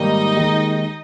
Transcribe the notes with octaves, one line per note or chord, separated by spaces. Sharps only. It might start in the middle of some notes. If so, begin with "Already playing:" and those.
Already playing: G#2 D#3 G3 A#3 D#4 D#5
D#2 D#3 G#3